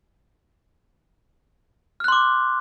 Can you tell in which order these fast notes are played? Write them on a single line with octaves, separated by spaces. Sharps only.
F6 F#6 C6 D6